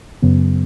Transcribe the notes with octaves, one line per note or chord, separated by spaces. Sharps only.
F#2 C#3 F#3 B3